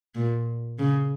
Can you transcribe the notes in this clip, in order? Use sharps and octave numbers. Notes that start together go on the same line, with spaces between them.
A#2
C#3